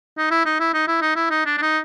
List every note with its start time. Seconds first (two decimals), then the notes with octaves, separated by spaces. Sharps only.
0.18 D#4
0.31 E4
0.46 D#4
0.60 E4
0.74 D#4
0.88 E4
1.02 D#4
1.16 E4
1.30 D#4
1.46 D4
1.58 D4
1.62 D#4